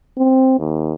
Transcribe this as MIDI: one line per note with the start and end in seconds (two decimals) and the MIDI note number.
0.18 0.58 60
0.59 0.93 39